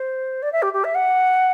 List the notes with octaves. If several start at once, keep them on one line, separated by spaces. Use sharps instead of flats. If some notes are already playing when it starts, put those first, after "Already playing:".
Already playing: C5
D5
E5
G4
G4
E5
F#5